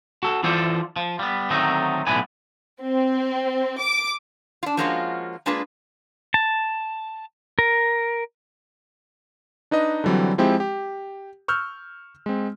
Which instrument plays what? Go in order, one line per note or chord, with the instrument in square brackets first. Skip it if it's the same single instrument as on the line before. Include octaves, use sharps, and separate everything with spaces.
[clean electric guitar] F#4 A4
D3 E3 F4 A4 C5 D5
F3
G3 B3
D3 D#3 F#3 A3 C4 D#4
B1 A2 D3 B3 B4 G#5
[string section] C4
D6
[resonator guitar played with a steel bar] D4 F4
F3 G#3 A#3 C#4 F4 F#4
G#3 A#3 D4 F4 G#4 B4
[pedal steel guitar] A5
A#4
[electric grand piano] D4 D#4 B4 D#5
D3 E3 F#3 G3 C4
F3 G#3 C4 E4 G4
G4
C#6 E6 F6 G6
G#3 C4